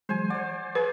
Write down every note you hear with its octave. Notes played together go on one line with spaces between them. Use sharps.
E3 F#3 G#3 C5 G#5
C5 D5 F#5
G#4 B4